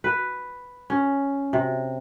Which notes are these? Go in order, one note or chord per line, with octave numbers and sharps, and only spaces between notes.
B4
C#4
C3